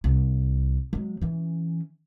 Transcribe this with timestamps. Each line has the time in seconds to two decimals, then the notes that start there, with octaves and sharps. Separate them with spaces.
0.04 C2
0.93 F#3 G#3
1.21 E3 C#4